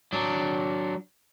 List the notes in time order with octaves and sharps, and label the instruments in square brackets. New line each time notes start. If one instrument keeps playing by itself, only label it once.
[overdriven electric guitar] F#3 D4